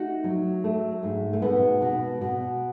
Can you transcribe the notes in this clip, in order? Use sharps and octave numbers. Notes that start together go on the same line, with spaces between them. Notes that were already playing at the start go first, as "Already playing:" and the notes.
Already playing: A3 D#4 F#4
F#3
A3
G#2
A3
B2 B3
B2
B2